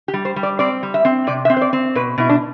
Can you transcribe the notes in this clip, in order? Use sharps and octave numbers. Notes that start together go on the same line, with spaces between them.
G4
G3
C5
G3
D5
C4 D5
G3
E5
C4
C3 D5
E5
C4
C5
D5
C4
B2 B4
B2 E4
D4